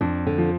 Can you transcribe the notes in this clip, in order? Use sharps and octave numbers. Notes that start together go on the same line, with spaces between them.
F2 D4
D3
F3